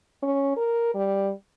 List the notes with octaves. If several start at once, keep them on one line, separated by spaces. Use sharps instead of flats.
C#4
A#4
G3